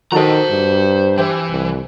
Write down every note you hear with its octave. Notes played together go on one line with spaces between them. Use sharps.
D#3 F#4 A4 C5 D#5 A#5
G2
E3 G4 C5 E5
C2